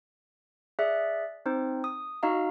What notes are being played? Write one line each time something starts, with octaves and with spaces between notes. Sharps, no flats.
G#4 D5 E5 F#6
C4 D#4 C5
D#6
D#4 F#4 D#5 F5 A#5